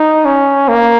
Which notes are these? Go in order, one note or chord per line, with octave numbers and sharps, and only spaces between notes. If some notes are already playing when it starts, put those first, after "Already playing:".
Already playing: D#4
C#4
A#3